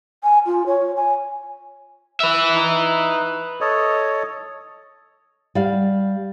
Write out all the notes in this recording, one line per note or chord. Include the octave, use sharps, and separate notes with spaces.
G#5
F4
C#5
G#5
B4 E5
D#4
A4 C#5 D#5
G3 F5